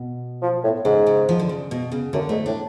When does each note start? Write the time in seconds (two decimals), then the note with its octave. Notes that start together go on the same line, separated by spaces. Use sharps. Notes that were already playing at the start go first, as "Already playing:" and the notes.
Already playing: B2
0.42 F3
0.64 A2
0.85 G#2 C#3
1.06 C#3
1.29 F3
1.40 D3
1.49 C#3
1.71 B2
1.92 C#3
2.13 F#2 D3
2.29 G#2 A3
2.46 A2 D4